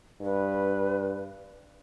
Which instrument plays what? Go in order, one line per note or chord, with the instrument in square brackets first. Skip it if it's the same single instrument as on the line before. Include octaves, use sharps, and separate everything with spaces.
[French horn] G2 [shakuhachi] B4